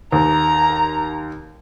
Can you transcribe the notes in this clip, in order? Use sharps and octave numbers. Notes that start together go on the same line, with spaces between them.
D#2 A#5